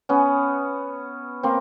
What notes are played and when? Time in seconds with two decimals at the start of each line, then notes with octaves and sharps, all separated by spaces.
0.09 B3 C#4
1.43 A#3 C4